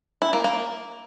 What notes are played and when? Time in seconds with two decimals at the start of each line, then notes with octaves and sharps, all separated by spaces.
0.22 E4
0.33 A#3
0.44 A#3